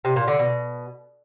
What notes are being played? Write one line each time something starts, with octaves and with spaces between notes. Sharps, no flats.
C3
A#2
D3
B2